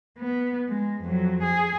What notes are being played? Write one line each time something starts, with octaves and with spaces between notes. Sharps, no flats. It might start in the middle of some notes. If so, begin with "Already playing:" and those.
B3
G#3
F2 F#3
G#4